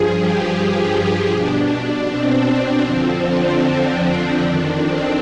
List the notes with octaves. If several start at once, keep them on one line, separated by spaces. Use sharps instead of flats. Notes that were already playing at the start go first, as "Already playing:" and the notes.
Already playing: G2 F3 G#4
G4
B2 D4
C4
F2 D3 F3
D4
D4
F2 D#3
C4